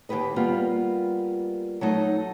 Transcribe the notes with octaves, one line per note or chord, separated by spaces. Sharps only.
D#2 C3 G4 B4 D#5
G3 A#3 B3 F4 G4
F#3 A3 D#4